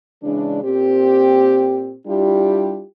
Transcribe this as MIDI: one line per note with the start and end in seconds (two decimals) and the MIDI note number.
0.24 0.62 49
0.24 0.62 52
0.24 0.62 56
0.24 0.62 62
0.63 1.95 46
0.63 1.95 60
0.63 1.95 67
2.07 2.83 55
2.07 2.83 62
2.07 2.83 64
2.07 2.83 65
2.07 2.83 67